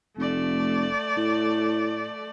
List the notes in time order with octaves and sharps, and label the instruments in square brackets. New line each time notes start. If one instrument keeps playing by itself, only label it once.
[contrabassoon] F1 [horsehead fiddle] A3 D5
[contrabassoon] A2